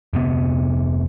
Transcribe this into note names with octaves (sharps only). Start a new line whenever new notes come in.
F1 C3 B3